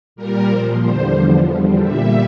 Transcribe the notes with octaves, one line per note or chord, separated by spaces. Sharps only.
A#2 G3 A#4
A#2 F3 C5
E2 D3 G3 C5
E2 D3 F3
E2 D3 G3
A#2 G3 E5